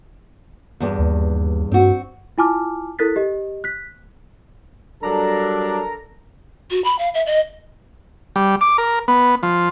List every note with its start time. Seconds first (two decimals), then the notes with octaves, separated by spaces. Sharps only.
0.80 E2 G2
0.98 D#2
1.72 G2 C4 F#4
2.38 E4 F4 G#5 A5 D6 F6
2.99 E4 A4 A#4 F#6 A6 B6
3.16 G4 D#5
3.64 F#6 B6
5.03 F#3 G3 D4 A4 A#4 A#5
6.71 F#4
6.84 B5
6.99 F5
7.14 E5
7.26 D#5
8.36 G3
8.61 D6
8.78 A#4
9.08 B3
9.43 F3